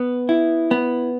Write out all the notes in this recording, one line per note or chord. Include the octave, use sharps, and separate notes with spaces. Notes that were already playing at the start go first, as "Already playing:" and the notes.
Already playing: B3
E4
B3